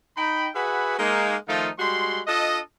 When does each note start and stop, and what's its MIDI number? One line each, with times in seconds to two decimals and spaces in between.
0.17 0.49 63
0.17 0.49 79
0.17 0.49 83
0.56 0.98 66
0.56 0.98 68
0.56 0.98 71
0.56 0.98 76
0.56 0.98 78
0.56 0.98 83
0.99 1.36 56
0.99 1.36 58
0.99 1.36 63
1.49 1.71 51
1.49 1.71 53
1.49 1.71 57
1.49 1.71 63
1.49 1.71 65
1.79 2.21 55
1.79 2.21 56
1.79 2.21 66
1.79 2.21 84
2.27 2.60 62
2.27 2.60 65
2.27 2.60 69
2.27 2.60 75